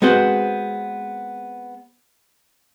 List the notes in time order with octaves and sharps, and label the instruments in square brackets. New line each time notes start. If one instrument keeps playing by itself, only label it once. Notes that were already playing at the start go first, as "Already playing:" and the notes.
[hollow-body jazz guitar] G#3 B3 C4 F#4 C5